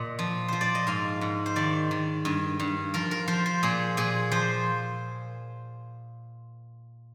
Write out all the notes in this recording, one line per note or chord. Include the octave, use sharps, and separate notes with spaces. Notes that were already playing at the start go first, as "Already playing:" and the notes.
Already playing: A#2 D#5
F3
F3 C5
D5
D#5
G#2 F5
G#2
C5
D#3 D5
D#3
G2
G2
F3 A#4
A#4
F3 C5
C5
A#2 G#4
A#2 G#4
F3 C5